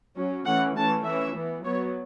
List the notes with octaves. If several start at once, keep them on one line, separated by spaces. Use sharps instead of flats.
F#3 C#4
E3 A3 C#4 F#5
E3 A3 C#4 A5
E3 E5
C#4
E3 B3
F#3 B3 C#5